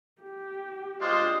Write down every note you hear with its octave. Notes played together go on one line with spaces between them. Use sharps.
G4
G#3 D4 F4 C5 D#5